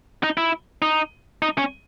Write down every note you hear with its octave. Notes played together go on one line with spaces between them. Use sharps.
D#4
E4
D#4
D#4
C#4